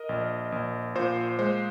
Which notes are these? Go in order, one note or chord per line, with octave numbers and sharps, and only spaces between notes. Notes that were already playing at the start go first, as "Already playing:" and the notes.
Already playing: A#4 D#5
A#1
A#1
A#2 C5
G#3 C5